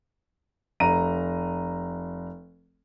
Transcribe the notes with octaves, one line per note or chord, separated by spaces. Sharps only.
F1 A#5 D#7